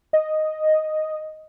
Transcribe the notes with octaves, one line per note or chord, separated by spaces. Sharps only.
D#5